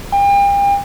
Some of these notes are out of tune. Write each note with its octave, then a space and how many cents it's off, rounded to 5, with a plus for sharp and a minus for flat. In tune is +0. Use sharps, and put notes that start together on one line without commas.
G5 +40